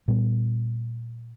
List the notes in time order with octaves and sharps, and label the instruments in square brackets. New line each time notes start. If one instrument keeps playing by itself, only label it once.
[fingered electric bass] A#2 G3 B3